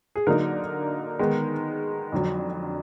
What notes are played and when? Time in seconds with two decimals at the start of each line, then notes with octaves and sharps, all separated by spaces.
0.16 G#4
0.27 D3 F#3 A#3 D#4 A#4
1.19 D#3 G#3 B3 D#4
2.12 F2 D3 F#3